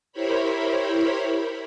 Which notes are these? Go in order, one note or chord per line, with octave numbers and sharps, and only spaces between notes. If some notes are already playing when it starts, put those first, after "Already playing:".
E4 G4 A#4 C5 C#5 B5